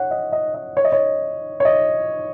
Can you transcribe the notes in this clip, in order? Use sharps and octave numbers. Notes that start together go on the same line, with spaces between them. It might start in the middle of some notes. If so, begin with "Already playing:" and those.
Already playing: C#5 F#5
D#5
D#5
D#5
C#5
D#5
C#5
C#5
D#5